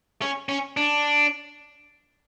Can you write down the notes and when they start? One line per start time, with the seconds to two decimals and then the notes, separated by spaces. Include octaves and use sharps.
0.22 C#4
0.49 C#4
0.77 D4